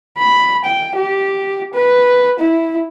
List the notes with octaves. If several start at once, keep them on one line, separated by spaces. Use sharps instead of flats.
B5
G5
G4
B4
E4